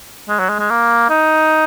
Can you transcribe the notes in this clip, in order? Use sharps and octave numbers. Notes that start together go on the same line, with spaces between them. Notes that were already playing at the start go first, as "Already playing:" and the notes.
G#3
F#3
G#3
G#3
A#3
D#4